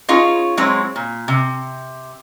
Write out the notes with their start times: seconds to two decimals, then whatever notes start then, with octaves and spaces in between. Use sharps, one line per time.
0.08 C#4 D#4 F4 G#4 C#5
0.57 F#3 G#3 C4 E4 C#5
0.96 A#2
1.28 C3